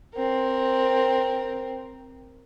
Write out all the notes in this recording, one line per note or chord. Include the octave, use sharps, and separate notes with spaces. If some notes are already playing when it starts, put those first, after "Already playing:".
C4 A#4